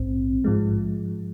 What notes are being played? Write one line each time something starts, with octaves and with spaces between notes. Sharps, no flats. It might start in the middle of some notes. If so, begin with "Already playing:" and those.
Already playing: A#1 G#2 C4
G#2 F3 G#3